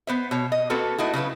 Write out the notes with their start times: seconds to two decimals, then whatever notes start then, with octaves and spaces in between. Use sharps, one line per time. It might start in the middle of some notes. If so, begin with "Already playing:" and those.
0.07 B3 C5 E5
0.31 B2 C#5
0.52 D#5
0.70 A#3 C4 F#4 A4 B4
0.98 A3 D#4 E4 F#4
1.13 C#3 F#3 E4 B4